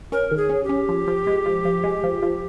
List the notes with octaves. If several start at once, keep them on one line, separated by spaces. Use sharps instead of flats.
C#4 A#4
D#3
G#4
C#4
G4
C#4
F3
F3
G#3
F3
F3
G#3
F3
F3